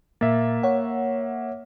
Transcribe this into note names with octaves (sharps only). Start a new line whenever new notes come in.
A#2 A#3 E5 A6
C#5 F#5